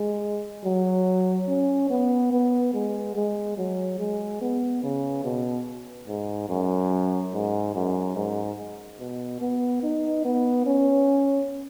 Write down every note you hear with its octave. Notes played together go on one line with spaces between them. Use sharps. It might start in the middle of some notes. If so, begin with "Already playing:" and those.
Already playing: G#3
F#3
C#4
B3
B3
G#3
G#3
F#3
G#3
B3
C#3
B2
G#2
F#2
G#2
F#2
G#2
B2
B3
D#4
B3
C#4